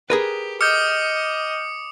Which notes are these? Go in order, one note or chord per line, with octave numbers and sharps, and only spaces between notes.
G4 G#4 A#4 B4
D#5 D6 D#6 F6 G6 C#7